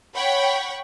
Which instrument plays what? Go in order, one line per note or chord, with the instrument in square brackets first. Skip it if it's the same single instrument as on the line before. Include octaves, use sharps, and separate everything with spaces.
[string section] C#5 F#5 G5 B5 C#6